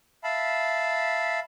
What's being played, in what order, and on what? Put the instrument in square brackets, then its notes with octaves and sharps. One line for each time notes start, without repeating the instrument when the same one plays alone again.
[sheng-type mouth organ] E5 F5 A5 B5